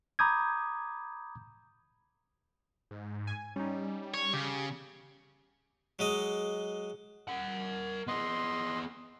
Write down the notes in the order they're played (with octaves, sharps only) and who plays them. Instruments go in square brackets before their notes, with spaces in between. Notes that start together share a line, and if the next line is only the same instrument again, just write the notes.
[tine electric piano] A#5 B5 D6 D#6 G6 G#6
[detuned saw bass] G#2
[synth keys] G#5
[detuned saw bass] G3 [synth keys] C#4 D#4
[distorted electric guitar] C#5
[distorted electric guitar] C#3 [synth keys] G4
[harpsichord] F#3 G#3 D#5
[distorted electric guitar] A#4 F#5
[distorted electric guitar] B3 G#4 [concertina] D#5 C6